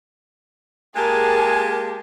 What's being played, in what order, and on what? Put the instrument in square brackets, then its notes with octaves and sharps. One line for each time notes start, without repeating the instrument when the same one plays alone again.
[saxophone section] G#3 A#3 G4 [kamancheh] G#4 A#4 [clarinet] G#5 [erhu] A5